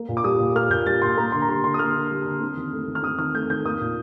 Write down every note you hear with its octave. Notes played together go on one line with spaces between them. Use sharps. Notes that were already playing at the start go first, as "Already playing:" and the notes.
Already playing: A#3
A#2
D6
G3 D#6
A#2
A#3 F6
A#2 G6
G3 A6
A#2 C6
A#3 A#5
D3 C6
A#5
G3 C6
D3 C6
D#6
A#3 F6
D3
G3
D3
C4
D#3
A3
D#3
F6
C4 D#6
D#3 F6
A3 G6
D#3 G6
A#3 D#6
A#2